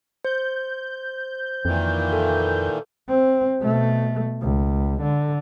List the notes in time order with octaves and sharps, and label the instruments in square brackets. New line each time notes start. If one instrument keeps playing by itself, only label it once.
[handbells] C5 [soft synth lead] G6
[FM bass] F2 [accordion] A#2 D#3 E3
[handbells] A4
[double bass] C4
B2 A3
C#2
D3